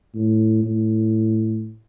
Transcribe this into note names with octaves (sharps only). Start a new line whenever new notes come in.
A2
A2